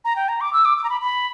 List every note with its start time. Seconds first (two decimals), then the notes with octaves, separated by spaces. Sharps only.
0.05 A#5
0.16 G5
0.29 A#5
0.41 D6
0.53 E6
0.65 D6
0.78 D6
0.84 A#5
0.90 B5
1.01 B5